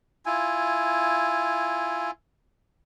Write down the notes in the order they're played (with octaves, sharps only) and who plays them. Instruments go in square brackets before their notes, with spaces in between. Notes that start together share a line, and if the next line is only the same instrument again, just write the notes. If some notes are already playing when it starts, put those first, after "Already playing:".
[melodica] E4 F4 G#5